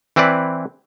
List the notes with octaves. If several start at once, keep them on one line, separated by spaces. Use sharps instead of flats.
E3 C4 E4 B4 D5